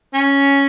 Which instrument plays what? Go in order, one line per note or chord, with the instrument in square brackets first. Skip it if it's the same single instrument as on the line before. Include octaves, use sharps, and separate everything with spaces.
[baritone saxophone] C#4